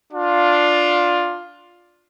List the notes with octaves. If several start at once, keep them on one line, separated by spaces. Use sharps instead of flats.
D4 F4